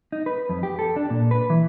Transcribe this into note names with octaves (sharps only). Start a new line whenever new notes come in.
D#4
B4
F2
G4
A4
D4
A#2
B4
E3